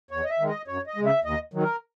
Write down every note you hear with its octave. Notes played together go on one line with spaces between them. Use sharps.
E2 C#5
D#5
E5
D#3 G#3
D#5
F#2 C#5
D#5
C#3 G#3
E5
D#2 D#5
D#3 F#3
A#4